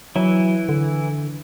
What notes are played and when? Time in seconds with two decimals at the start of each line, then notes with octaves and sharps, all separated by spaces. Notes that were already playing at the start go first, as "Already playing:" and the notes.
0.16 E3 F#3 E4
0.69 D3